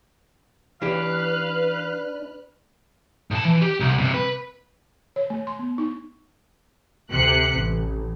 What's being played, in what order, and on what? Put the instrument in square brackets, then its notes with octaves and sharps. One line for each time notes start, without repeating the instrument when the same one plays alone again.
[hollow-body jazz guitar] E3 G4 [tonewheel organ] D4 [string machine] B4 F6 F#6 [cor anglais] F5
[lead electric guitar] A2 A5
E3
G4
C2
G2 C3
B4
[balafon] C#5
A3
C6
B3
D#4
[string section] D2 C3 F#6 C#7
A1